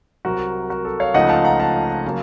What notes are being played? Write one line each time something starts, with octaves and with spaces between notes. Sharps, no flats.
C2 C3 F#3 F#4 A#4
F#4 A#4
A4
C#5 F5
C#2 C#3 F3 A3 D#4 D#5 F#5
F5 A5
F#5 A#5
F5 A5
C#3 F#3 A#3